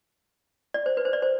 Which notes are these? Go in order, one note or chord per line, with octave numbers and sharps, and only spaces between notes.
D5
C5
B4
C5
D5
C5